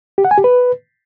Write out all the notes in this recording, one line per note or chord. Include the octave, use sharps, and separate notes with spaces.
G4
F#5
G#5
G4
B4